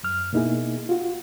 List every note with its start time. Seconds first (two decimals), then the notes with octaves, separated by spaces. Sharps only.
0.03 F#2 F6
0.33 B2 A#3 D#4 E4 G#4
0.89 F4 F#4